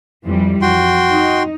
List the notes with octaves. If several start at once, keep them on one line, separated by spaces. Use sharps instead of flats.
F2 E3 G3
F2 F#4 G5 C6
D#4